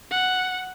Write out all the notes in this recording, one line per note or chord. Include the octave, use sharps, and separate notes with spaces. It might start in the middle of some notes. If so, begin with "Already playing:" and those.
F#5